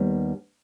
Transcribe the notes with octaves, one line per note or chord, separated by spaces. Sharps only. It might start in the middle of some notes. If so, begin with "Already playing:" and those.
Already playing: D#2 D#3 G3 B3